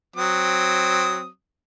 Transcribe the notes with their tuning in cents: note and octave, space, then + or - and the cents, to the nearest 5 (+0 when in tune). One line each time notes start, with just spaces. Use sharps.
F#3 +0 C4 +0 D#6 +0